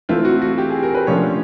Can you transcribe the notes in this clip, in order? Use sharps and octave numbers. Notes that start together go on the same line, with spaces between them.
E3 A3 C4 F4
F#4
F#4
G4
G#4
A#4
B4
D3 F3 A3 C#4 F4 C#5